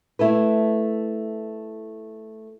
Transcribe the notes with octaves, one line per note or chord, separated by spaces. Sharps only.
A3 E4 A4 B4